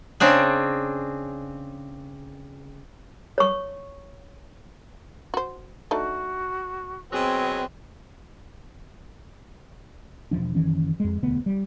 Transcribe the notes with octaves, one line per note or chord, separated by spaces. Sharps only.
C#3 C4 D4 G#4
C#5 C#6
F#4 C5
A3 D4 D#4 F#4
B2 F#3 C4 G#4
E1 F2 F3 D4
F#1 D#3 E3 C#4
F2 G#3
E1 D2 B3
G3